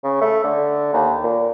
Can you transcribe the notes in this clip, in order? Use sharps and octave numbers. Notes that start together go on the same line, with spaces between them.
C#3
A3
D3
D#2
A#2